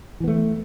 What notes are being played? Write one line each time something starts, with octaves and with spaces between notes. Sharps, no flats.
E3 A3 B3